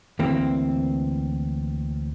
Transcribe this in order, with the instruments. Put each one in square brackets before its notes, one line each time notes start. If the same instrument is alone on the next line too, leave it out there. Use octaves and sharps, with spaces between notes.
[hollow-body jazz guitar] D2 E3 A#3 C4